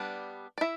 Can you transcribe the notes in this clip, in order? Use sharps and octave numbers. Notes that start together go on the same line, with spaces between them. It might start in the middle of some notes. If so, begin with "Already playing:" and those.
Already playing: G3 B3 D4
D5
E4 E5